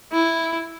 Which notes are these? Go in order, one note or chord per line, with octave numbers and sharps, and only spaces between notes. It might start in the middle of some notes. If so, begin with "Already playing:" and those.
E4